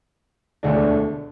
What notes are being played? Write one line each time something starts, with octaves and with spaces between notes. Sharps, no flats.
E1 D2 D3 A3 D4